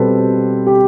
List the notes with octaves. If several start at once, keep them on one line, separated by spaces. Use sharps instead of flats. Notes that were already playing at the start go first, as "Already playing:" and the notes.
Already playing: B2 G3 C4 A4 B4 C5
G4